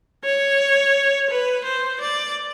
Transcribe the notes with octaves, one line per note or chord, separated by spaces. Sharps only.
C#5
B4
C5
D5